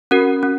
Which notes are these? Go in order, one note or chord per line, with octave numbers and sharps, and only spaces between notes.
C#4 F#4 A#4
C#4